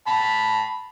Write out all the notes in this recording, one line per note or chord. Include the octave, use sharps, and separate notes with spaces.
A5 B5